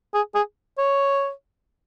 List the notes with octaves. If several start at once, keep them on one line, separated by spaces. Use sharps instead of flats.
G#4
G#4
C#5